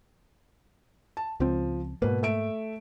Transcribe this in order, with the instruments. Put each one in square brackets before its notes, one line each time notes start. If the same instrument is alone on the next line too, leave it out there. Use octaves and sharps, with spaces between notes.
[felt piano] A5
[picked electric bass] C#2 C4 [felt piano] F3
[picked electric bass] G#2 A#3 [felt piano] B2 B4
[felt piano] A3 E5 D7